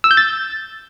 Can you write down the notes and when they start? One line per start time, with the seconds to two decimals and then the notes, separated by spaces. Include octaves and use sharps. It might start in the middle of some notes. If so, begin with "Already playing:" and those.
0.04 E6
0.11 G6
0.17 A6